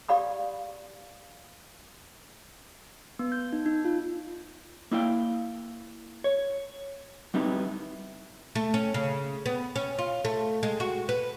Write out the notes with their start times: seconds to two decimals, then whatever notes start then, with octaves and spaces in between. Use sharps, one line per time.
0.09 G4 D5 F5 B5 D#6
3.19 B3
3.32 G6
3.53 D#4
3.66 D#4
3.85 F4
4.91 A#3 E4 F5 G5
6.24 C#5
7.34 G3 B3 C4 D#4 E4 G4
8.55 A3
8.74 C#4
8.94 C#3
9.46 B3
9.76 C#4
9.99 F4
10.25 A3
10.63 G#3
10.80 F#4
11.09 B4